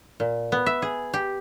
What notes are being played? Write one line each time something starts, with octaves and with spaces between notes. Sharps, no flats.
A#2
B3
E5
G#4
G4